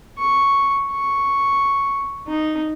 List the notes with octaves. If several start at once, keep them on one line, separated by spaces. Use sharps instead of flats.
C#6
C#6
D#4